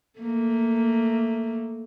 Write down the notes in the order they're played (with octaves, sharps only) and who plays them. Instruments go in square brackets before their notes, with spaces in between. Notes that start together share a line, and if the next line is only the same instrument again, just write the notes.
[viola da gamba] A3 A#3